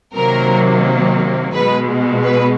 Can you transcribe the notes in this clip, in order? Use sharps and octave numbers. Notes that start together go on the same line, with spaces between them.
C3 D#3 F#3 A#3 A#4
B2 G#3 B4
B4